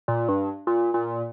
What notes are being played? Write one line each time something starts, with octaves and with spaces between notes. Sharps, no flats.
A#2
G2
A#2
A#2